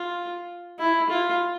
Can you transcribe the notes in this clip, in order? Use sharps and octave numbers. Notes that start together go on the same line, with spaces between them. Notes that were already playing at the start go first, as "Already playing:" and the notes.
Already playing: F4
E4
F4